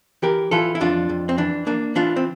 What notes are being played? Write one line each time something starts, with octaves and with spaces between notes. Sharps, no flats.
E3 G4 A#4
E3 F4 A4
E4
F2 D4 F4
F2
C4
E3 D4
A#3 D4
E3 D4 F4
C4